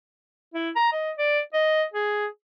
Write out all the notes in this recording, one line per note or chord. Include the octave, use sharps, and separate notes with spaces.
E4
A#5
D#5
D5
D#5
G#4